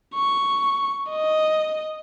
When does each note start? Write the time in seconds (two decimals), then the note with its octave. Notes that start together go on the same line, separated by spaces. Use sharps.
0.15 C#6
1.10 D#5